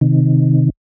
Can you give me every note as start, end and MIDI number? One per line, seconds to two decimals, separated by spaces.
0.01 0.70 48
0.01 0.70 51